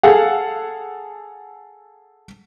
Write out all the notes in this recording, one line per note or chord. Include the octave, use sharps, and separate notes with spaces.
G#4 A4 F5 F#5